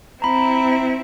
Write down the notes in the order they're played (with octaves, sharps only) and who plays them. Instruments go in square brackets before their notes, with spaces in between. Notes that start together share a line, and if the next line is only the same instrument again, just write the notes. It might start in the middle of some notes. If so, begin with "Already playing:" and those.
[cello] C4 E4 [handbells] A#5 B5